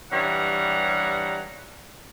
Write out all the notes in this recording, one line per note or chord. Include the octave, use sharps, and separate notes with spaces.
G2 E3 G3 C#5 F#5 A#5